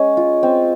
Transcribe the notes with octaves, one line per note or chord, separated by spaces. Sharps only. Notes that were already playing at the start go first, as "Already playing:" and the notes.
Already playing: G#3 C#4
F4
C4